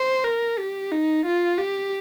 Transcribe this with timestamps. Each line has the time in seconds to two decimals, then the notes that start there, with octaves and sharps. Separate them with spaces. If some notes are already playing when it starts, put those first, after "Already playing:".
Already playing: C5
0.24 A#4
0.58 G4
0.92 D#4
1.26 F4
1.58 G4